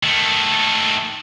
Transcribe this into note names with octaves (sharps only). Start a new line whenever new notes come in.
D#3 A3